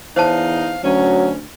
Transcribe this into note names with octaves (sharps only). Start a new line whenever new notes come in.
E2 D#4 C5 C#5 F5 A5
D2 F#3 C#4